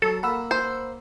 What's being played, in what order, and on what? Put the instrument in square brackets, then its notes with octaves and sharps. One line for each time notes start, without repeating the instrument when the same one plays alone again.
[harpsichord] F#3 [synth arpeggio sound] A4
[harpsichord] A#3 [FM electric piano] F#5 B5 E6
[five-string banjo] C5